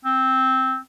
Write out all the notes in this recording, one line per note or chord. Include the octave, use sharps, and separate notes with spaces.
C4